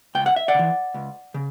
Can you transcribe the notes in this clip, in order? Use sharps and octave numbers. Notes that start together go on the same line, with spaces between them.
C#2 G5
F#5
E5
D5 F#5
C#3
E3
C#2
C#3